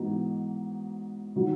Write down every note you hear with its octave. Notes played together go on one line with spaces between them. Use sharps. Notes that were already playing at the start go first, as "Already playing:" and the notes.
Already playing: G#2 E3 B3 D#4 F#4
D#3 F#3